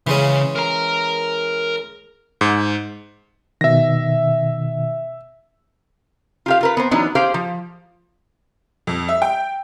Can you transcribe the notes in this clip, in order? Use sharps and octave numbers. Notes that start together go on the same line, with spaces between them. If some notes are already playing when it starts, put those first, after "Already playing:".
C#3 E3 G#3 C#4
A#4 A#5
G#2
B2 D#3 E5 A#6
F4 G4 F5
F4 A#4 B4
B3 C4 C5
E3 F#3 B3 D4 D#4
G4 G#4 C5 F5
F3
F2
E5
G5